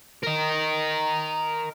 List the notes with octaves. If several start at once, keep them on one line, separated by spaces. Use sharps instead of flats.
A#4 D#5